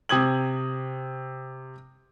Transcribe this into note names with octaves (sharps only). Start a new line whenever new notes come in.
C3 D#6 G#6 F#7